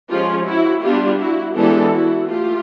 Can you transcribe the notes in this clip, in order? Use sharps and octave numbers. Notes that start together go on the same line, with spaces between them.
F3 G#3 C#4 F4 G4
E4 F#4
G3 B3 D4 F4 G4
E4 F#4
E3 G#3 B3 D4 G4 A4
E4 F#4
A3 F4 G4